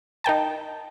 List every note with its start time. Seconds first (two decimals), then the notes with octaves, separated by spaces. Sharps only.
0.24 D#4 A#4 G5 A5